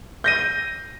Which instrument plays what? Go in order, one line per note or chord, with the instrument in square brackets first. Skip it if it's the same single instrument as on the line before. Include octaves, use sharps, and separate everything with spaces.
[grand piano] G6 A#6 D#7